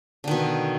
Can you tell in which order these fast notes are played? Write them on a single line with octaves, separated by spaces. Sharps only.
D3 D#3 B2